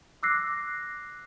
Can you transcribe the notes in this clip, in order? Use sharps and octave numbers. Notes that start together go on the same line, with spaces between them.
D6 E6 F#6 A#6 C7